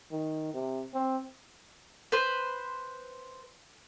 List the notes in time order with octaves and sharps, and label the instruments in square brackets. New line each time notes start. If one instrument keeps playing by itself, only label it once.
[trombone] D#3
C3
C4
[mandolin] B4 C5